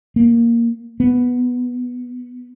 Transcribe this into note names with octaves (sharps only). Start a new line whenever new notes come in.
A#3
B3